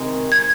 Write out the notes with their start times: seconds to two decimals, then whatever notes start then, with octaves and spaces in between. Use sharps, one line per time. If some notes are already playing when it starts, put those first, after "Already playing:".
Already playing: C3 D#3 G#3
0.32 G#6